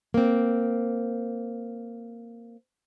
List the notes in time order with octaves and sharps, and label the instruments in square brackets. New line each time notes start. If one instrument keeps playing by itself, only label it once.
[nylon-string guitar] A#3 C4